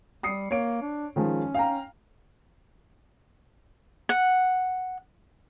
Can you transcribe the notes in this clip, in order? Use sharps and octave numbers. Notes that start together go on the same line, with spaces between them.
G3 D#6 C7 C#7
A#3 C#5 D7
D4
D#3 F3 G#3 C#4
F5 G5 A#5
F#5